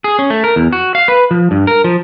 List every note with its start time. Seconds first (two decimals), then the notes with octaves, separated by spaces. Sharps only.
0.04 G#4
0.19 C#4
0.30 A3
0.44 A#4
0.56 E2
0.73 F#4
0.95 F5
1.08 B4
1.31 F3
1.51 G2
1.67 A#4
1.84 F3